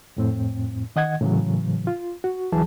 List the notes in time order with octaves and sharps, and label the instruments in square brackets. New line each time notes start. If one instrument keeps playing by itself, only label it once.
[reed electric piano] F2 A2 C4
D#3 D#5 F#5 G#6
A2 C#3 E3 F#3
F4
F#4
D2 E3 F#3 G#4 A5